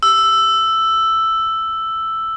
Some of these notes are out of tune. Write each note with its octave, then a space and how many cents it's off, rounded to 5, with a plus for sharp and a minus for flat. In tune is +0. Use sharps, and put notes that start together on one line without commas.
E6 +5